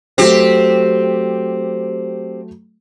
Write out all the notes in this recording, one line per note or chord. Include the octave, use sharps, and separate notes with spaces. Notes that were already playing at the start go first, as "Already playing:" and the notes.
F#3 A3 C4 G4